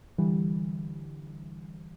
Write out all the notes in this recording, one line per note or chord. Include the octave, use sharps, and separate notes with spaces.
D3 E3 G3